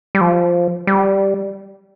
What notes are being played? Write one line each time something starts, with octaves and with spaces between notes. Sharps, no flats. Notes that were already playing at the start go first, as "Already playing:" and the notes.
G3
F3
G3